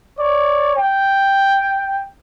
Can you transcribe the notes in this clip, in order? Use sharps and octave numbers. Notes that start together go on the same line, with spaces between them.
C#5 D5
G5